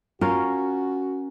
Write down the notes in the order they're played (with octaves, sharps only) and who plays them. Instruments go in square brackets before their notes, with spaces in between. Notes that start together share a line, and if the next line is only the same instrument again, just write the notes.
[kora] C#4 A#4 [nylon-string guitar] F4 [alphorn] F#4